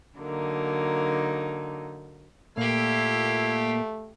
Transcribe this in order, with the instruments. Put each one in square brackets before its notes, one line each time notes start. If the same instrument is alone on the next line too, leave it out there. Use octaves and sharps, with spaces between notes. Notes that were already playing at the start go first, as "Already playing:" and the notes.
[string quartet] D3 F#3 A#3 D#4
[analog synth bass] A#2 [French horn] A3 [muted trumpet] E4 [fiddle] G4 F5